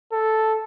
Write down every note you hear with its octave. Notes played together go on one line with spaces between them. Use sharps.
A4